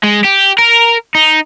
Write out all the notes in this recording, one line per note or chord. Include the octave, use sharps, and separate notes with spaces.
G#3
G4
A#4
D#4